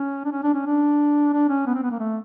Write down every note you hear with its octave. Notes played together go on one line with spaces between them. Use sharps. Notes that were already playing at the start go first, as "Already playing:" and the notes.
Already playing: C#4
D4
C#4
D4
C#4
D4
D4
C#4
B3
C4
B3
A#3
A3